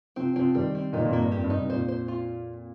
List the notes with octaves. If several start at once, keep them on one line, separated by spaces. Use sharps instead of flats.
C3 F3 C4
C3 F3 C4
D#3 G3 C4
C4
A#2 D#3 D#4
F2 A#2
A#3
G2
F2 G4
G2
D#4
G2 C3
F2 A#2 C5
C5
F4